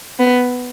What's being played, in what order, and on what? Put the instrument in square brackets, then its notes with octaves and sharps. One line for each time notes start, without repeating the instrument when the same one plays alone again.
[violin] B3